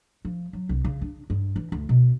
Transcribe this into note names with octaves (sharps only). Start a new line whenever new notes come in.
F3
F#3
C2
C#3
D4
G2
E3
D2
B2